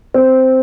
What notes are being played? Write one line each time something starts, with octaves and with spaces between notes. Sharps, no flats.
C4